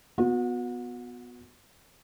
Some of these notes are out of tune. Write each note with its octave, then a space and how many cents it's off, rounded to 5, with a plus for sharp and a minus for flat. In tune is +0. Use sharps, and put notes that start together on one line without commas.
B3 +0 F#4 -35